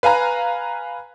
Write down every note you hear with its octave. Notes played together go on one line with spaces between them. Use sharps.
B4 F5 G#5 A#5 F#6